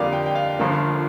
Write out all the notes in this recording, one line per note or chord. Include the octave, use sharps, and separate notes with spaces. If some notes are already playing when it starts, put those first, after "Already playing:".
Already playing: F2 D3 G3 A#3 D4 D5 F5
G5
G5
F5
G1 G2 D3 F3 A#3